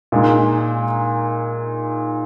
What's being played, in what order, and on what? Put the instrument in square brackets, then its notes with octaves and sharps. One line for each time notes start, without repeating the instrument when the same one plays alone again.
[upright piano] A#2 G#3 D#4